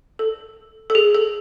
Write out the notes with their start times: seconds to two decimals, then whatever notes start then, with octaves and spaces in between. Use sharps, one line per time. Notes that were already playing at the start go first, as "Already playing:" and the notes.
0.19 A4
0.90 A4
0.95 G#4
1.15 A4